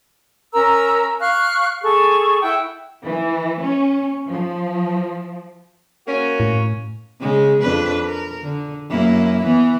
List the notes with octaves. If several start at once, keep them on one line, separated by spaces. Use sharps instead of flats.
C#4 A#4 A#5 E6
F5 C#6 F6 F#6
G#4 A4 C#6
E4 F#5 G5
E3
C#4
F3
A#3 C#4 F#4
A2
C#3 G#3
F2 D4 B4
A#4
D3
F#2 A#3 E4
E3 B3